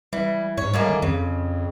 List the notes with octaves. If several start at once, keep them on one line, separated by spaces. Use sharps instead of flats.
E3 G3
G#2 C#5
A2 G3 G#3 A#3
D#3
F2 C#3